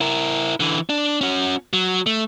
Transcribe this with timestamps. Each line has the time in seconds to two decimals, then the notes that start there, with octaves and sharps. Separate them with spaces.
0.01 E4 A#4
0.60 D3 E3
0.89 D4
1.21 C#4 F#4
1.73 F#3
2.06 A3